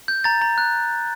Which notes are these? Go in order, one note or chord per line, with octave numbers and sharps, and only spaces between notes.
G6
A#5 A6
A#5
F#6